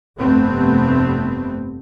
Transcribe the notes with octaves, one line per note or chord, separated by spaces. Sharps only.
F1 G2 C3 A3 B3 C4